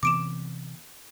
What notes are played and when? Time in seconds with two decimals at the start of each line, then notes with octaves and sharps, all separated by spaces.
0.03 C3 E3 B3 D6 D7 E7